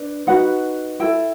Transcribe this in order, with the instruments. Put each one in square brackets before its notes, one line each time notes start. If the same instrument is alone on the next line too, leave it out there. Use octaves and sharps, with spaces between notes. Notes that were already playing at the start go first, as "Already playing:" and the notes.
Already playing: [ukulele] D4 B4
D#4 F#4 B4 F#5
E4 A4 G5